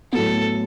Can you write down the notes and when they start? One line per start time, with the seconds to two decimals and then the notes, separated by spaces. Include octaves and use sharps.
0.12 A2 F#3 B3 A4